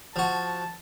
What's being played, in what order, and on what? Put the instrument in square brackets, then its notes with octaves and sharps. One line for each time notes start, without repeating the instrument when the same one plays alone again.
[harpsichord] F3 F#4 [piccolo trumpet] A5